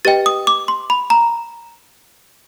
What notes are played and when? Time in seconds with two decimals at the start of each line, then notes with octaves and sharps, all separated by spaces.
0.05 G4 B4 D#5 G5 A6
0.26 D#6
0.47 D6
0.68 C6
0.90 B5
1.10 A#5